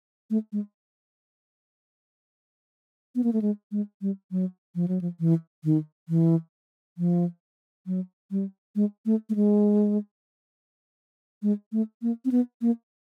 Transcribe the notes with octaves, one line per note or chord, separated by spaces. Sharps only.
A3
G#3
B3
A#3
A3
G#3
G#3
G3
F#3
F3
F#3
F3
E3
D#3
E3
F3
F#3
G3
G#3
A3
A3
G#3
G#3
A3
A#3
C4
B3
A#3